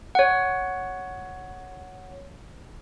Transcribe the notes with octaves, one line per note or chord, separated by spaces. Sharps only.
C#5 F#5